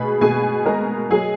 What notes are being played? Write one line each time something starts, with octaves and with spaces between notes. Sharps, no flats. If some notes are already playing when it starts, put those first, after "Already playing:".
Already playing: B2 G#3 G#4 B4 G#5 B5
B2 G#4 G#5
G#3 A#4 A#5
F#3 G#4 G#5